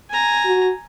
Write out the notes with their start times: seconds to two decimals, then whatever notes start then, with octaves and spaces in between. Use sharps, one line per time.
0.10 G#5 A#5
0.45 F#4